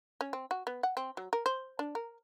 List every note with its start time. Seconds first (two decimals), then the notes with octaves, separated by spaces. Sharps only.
0.21 C#4
0.33 C4
0.51 F#4
0.67 B3
0.83 F#5
0.97 C4
1.17 F#3
1.33 A#4
1.46 C5
1.79 D4
1.95 A#4